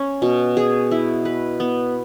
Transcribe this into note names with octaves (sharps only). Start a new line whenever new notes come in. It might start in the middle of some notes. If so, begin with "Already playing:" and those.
Already playing: C#4
B2
G#4
E4
B4
B3